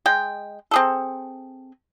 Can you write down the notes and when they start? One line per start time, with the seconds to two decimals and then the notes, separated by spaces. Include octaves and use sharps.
0.06 G#3 G5
0.71 C4 G#4 A4